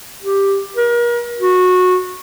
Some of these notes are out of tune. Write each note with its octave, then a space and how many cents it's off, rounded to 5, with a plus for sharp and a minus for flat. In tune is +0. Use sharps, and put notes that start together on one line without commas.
G4 +5
A#4 +35
F#4 -20